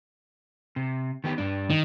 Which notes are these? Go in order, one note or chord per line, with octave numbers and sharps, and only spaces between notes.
C3
D#3 B3 G4
G2 D4
D#3